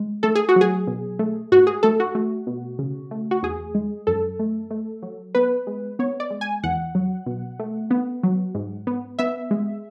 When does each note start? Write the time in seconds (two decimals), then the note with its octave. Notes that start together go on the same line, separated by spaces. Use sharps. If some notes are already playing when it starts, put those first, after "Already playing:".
Already playing: G#3
0.23 A3 A4
0.35 G#4
0.49 F#4
0.56 F#3 G#4
0.87 B2
1.19 A3
1.52 G#2 F#4
1.67 G#4
1.83 A3 A4
2.00 F#4
2.15 A3
2.47 B2
2.79 C#3
3.11 A3
3.31 F#4
3.43 E2 G#4
3.75 G#3
4.07 F#2 A4
4.39 A3
4.71 A3
5.02 F#3
5.35 B3 B4
5.67 G#3
5.99 B3 C#5
6.20 D5
6.30 G#3
6.41 G#5
6.64 E2 F#5
6.95 F#3
7.26 B2
7.59 A3
7.91 B3
8.23 F#3
8.55 G#2
8.87 B3
9.19 B3 E5
9.51 G#3